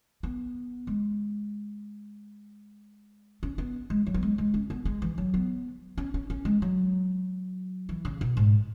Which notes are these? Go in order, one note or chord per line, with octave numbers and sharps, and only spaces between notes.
B3
G#3
C#4
B3
G#3
F#3
B3
G#3
G#3
C#4
B3
G#3
E3
F#3
B3
C#4
C#4
C#4
G#3
F#3
E3
C#3
B2
G#2